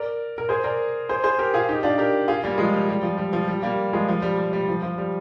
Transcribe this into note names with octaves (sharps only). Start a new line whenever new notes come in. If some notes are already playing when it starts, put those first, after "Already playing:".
Already playing: A#4 D5
A#4
G#4 C5
A#4 D5
G#4 C5
G#4 C5
G4 A#4
F4 G#4
D#4 G4
D4 F4
G4 A#4
F4 G#4
G3 A#3
F3 G#3
G3
G3
F3
G3
F3
G3
G3 A#3
F3 G#3
F3
G3
G3
G3
F3
F3
G3